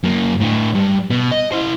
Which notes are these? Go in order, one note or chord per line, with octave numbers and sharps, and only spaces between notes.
F#2 A#3
A2 D3
G2
B2
D#5
E4 C5